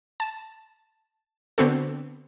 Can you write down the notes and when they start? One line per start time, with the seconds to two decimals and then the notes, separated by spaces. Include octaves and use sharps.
0.20 A5
1.58 D3 B3 C4 F#4 A4